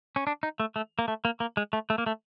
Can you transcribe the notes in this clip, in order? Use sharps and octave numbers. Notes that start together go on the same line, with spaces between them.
C#4
D4
D#4
A3
A3
A#3
A3
A#3
A#3
G#3
A3
A3
A#3
A3